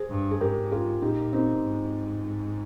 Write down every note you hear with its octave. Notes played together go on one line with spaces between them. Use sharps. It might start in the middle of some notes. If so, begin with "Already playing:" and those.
Already playing: G#4 C5
G2
G#4
G#2 G4 A#4
F4 G#4
A#2 D#4 G4
C4 D#4
G#2